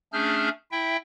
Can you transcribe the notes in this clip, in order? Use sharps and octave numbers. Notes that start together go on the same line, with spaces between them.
A3 C#4 D4 G#4 F6 G6
E4 E5 G5